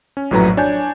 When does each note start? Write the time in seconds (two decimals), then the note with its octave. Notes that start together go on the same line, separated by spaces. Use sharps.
0.17 C#4
0.31 A#1 F#2 A2 F#3 B4 A#5
0.57 D4 C#5 G#5 G6